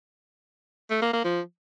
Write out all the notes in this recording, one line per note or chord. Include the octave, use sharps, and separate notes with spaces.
A3
A#3
A#3
F3